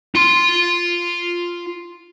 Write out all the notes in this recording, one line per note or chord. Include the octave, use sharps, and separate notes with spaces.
F4 C6